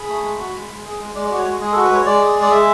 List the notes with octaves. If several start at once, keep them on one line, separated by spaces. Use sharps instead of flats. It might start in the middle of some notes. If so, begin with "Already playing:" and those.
Already playing: G#4 B5
A3
G#3
F#4
G#3
G#3
G#4
G#3
G#3 D5
F#4 D5
C#5
G#3
G#3 G#4
F#4 A4
B4
G#3 C#5
G#3 D5
G#4
G#3
D5
G#3 E5